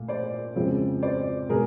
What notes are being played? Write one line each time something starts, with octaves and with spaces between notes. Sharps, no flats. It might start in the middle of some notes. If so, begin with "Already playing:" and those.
Already playing: A#2 A3
C5 D5
F2 C#3 F3 G#3 C4
C5 D5
B2 G#3 B3 G#4 A#4